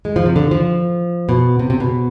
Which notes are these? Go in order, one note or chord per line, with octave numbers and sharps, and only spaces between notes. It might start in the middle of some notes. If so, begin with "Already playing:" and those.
G#3
F3
C3
D3
F3
B2
C3
C3
B2